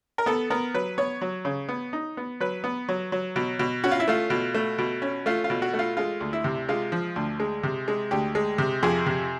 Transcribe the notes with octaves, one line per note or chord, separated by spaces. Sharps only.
A#4
B3 A4
B3 A#4
F#3 B4
B3 C#5
F#3
C#3
B3
D#4
B3
F#3 B4
B3
F#3
F#3
B2
B2
C#4 F#4
F4
E4
A3 F4
B2
A3
B2
C#4
A3 F4
F4
B2
F#4
A3
F4
G#3 F4
D2
E4
C3
G#3 F4
F3
D2
G#3
C3
G#3
D2 G4
G#3
C3
F2 G#4
C3